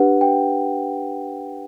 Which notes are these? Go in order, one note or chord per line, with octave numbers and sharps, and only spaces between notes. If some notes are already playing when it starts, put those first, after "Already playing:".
Already playing: D4 G4 B4 F#5
G5